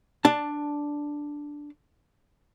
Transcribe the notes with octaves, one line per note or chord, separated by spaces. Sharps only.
D4 A5